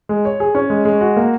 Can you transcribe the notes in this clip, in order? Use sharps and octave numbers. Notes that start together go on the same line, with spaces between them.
G#3
C#5
G#4
C#4
G#3
G#3
F#4
A#3